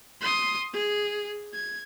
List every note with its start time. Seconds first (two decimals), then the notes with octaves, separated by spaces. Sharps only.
0.21 C6 D#6
0.73 G#4
1.53 G#6